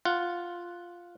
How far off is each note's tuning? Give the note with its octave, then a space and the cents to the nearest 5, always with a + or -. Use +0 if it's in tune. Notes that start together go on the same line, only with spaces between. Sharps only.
F4 +0 F#5 +0